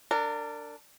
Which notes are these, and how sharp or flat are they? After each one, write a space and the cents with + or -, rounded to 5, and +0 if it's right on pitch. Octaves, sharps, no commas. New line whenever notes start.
D4 +0 A#4 -30